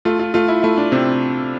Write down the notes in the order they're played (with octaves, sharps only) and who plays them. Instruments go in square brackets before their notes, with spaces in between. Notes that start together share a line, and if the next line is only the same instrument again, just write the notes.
[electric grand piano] A3 [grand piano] F4
[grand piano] F4
[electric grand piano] A3 [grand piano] F4
[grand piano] E4
[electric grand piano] A3 [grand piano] E4
[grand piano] D4
[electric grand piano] C3 [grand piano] C4